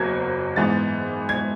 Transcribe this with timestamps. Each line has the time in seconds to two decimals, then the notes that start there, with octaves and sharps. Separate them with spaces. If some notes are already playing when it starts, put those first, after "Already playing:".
Already playing: F#1 E2 F#3 G#6
0.56 G#2 E3 B3 A6
1.29 G#6